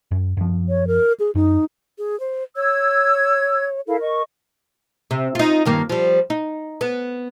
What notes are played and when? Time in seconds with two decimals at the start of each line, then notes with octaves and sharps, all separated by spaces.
0.11 F#2
0.37 F#2 F3
0.69 C#5
0.87 A#4
1.20 G#4
1.35 F#2 D#4
1.98 G#4
2.20 C5
2.56 C#5 E6 G#6
3.88 E4 A4 A#4 F5
4.01 D#5 C#6
5.11 C3
5.35 D#4 F4
5.65 G2 D#3 A#3
5.90 F3 G3
6.30 D#4
6.81 B3